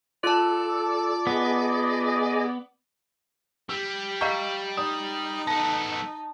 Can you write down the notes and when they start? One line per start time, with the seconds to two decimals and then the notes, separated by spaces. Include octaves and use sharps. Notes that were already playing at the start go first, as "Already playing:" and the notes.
0.24 F4 A4 D5 A5
1.27 B3 G#4 D#5
3.69 G3 E6
4.21 D#5 F5 A#5 C#6 G6
4.77 D#4 D5 D#6
5.47 B3 A4 A5